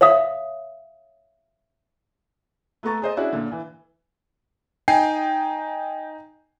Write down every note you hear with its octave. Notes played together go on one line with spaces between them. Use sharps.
C#5 E5 F5 D#6
A3 B3 A4 A#5 C#6 A6
G#4 C5 D#5
C#4 D4 E4 F#4 G#4 D5
A#2 D3
E3
D#4 G5 G#5 C7